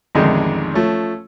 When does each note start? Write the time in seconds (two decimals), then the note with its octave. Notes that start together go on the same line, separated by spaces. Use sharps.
0.15 A1 F2 D3 D#3 G#3 D#4
0.74 F3 A3 C#4